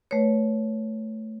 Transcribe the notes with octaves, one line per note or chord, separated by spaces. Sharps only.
A3 B4 C#5